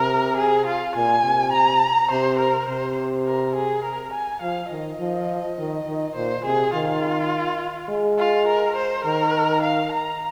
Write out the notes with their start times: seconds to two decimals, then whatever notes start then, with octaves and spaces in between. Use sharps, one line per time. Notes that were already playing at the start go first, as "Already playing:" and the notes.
Already playing: C3 A#4
0.38 G#4
0.67 F4
0.96 A#2 G#5
1.24 C3
1.53 A#5
2.11 C3 C5
2.40 A#4
2.69 C3 C5
3.27 A#4
3.56 G#4
3.85 A#4
4.14 G#5
4.42 F3 F5
4.71 D#3 D#5
5.00 F3
5.59 D#3
5.87 D#3
6.16 A#2 C5
6.45 C3 G#4
6.74 D#3 F4
7.89 G#3
8.19 F4
8.48 A#4
8.76 C5
9.05 D#3 A#4
9.63 F5
9.92 A#5